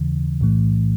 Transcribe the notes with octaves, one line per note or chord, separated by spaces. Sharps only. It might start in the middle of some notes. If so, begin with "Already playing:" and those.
Already playing: D#2 C#3 E3
B1 A2 E3 A3